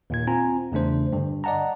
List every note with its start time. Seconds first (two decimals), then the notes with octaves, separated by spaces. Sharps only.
0.10 D#2 A#2 G#6
0.27 C4 F4 G#5 A#5
0.72 E2 C#3 A3 D4 C5
1.13 G2 D3
1.44 D5 D#5 F#5 A5 A#5